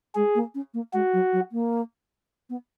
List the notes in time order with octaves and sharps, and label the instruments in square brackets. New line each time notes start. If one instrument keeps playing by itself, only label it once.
[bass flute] G#3 [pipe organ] G#4
[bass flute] A#3
C#4
A#3
[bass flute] G#3 [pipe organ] F#4
[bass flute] F#3
F#3
A#3
B3